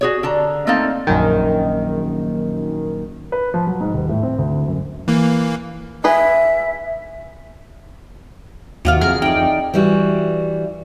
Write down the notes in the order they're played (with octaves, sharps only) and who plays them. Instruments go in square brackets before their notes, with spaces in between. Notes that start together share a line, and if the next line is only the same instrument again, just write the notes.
[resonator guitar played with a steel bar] F#4 G#4 C#5
D3 A5 A#5
A3 A#3 C4 D#4 A4 F5
[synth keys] A#1 F#2 D#3
[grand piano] B4
F3
F#3
G#2
D#1
A2
C4
D2
F#2
[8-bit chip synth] E3 A#3
[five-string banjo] G#3 G#4 B4 [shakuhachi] E5
[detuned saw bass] D#2 [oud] C3 F4 F5 [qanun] F#3
[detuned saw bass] F2 [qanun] G#4 A#4 A#5 [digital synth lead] F6
[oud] E3 [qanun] D#4 D5 [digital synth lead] G5
[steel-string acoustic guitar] E3 G3 F#4